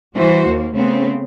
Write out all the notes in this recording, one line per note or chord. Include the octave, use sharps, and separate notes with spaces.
E3 G3 F#4 C5
D#2 A#3
C#3 A3 B3 C4